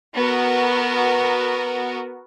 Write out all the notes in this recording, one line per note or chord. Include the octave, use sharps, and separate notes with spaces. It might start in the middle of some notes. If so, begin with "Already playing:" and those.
B3 F#4 A#4